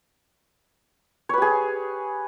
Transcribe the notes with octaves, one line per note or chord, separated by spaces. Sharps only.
G4 G#4 B4 C#5